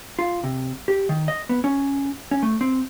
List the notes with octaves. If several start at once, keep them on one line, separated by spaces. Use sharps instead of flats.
F4
C3
G4
D#3
D#5
B3
C#4
C#4
A3
C4